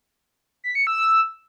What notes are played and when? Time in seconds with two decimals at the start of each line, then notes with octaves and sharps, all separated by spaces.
0.64 B6
0.75 C#7
0.87 E6